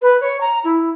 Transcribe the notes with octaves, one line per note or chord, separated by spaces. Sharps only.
B4
C#5
A#5
E4